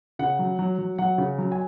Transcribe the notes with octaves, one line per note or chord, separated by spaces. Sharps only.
C#3 F#5
F#3
F#3
F#3
F#3 F#5
C#3
F#3
G#5